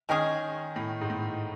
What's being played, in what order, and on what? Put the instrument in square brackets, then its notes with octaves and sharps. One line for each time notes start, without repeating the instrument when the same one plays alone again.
[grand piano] D#3 [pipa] G#3 C#4 G#4
[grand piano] A2
G#2
A2